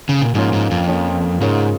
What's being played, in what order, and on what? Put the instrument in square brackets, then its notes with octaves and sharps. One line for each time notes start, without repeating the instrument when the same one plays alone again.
[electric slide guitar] C#3
A#2
[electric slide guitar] G#2 [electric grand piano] F3 A#3 C#4 F4 C#5
[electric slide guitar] G#2
F2
[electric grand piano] F3 A#3 C#4 F4 C#5
[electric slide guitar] G#2 [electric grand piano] C#3 G#3 F4 A#4 C#5